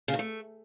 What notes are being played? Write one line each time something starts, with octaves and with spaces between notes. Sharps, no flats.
C#3
D#3
A3